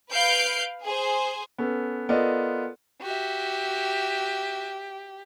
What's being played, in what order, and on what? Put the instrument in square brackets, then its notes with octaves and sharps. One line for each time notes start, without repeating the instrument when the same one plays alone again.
[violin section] B4 F5 G6 C7 D7
G#4 C5
[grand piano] B3 C#4 A4
B3 F4 A4 A#4 D5 D#5
[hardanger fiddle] F#4 E5 [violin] G4